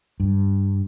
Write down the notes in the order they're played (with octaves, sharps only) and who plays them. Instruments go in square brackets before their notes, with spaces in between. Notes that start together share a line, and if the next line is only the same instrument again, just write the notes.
[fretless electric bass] G2